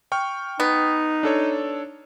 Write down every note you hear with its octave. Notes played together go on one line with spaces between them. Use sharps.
G5 C#6 F6
B3 D#4
D4 A4 C#5